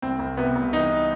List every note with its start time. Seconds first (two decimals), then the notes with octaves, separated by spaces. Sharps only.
0.02 C2 C4
0.19 C2
0.37 C3 B3
0.56 C2
0.73 E3 D#4